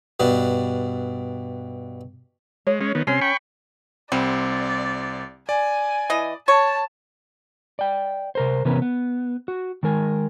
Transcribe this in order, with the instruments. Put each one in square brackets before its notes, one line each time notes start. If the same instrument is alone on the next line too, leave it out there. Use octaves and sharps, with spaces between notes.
[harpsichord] G2 B2 D4
[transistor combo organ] G#3 [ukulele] C#5
[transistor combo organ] G#3 C#4
D#3 B3
[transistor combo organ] C3 C6 [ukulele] C#4
[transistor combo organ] G5 B5 C#6
[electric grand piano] C2 C4 [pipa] G3 [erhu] D5
[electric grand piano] D5 [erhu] G#5
[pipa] E3 D#5
[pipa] C#5 [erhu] A5
[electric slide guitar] D5 G5
C3 A#4 C5
C3 E3 B3 C#4 A#4 B4
B3
F#4
D#3 G#3 A#4 G#5